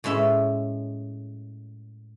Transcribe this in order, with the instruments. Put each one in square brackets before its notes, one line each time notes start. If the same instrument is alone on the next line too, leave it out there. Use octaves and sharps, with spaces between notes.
[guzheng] A2 G#3 C#4 E5